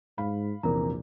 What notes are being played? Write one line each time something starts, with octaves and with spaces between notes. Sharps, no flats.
G#2 F5 B5
A#1 E2 C3 E3 A#4 A#5